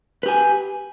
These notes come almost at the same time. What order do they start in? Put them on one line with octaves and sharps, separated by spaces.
B4 G4 G#5